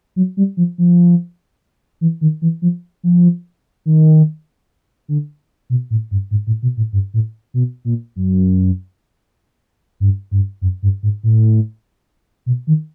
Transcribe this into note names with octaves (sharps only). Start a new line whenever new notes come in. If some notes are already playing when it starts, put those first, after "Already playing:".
F#3
G3
F3
F3
E3
D#3
E3
F3
F3
D#3
D3
B2
A2
G2
G#2
A2
B2
A2
G2
A2
B2
A#2
F#2
G2
G2
F#2
G2
G#2
A2
B2
D#3